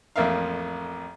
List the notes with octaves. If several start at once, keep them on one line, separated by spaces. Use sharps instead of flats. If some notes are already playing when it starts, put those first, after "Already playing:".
A1 F2 A#3 E5 F5